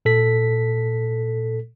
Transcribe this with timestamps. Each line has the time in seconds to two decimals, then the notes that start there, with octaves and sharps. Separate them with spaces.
0.05 A#2 A4 B6